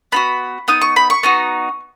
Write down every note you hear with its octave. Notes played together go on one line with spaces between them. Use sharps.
B3 D#4 F#4 B5
B3 D#4 D#6
C#6
B5
C#6
B3 D#4 F#4